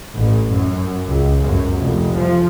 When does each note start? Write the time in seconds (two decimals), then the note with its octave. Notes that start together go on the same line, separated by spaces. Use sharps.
0.15 A1
0.49 F#2
1.07 C#2
1.41 F#2
1.79 F1
2.14 F3